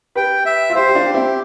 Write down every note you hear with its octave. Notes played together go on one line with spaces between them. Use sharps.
G4 B4 G5
E5
F4
E4 G4 C5
G4
D4 F4
G4
C4 E4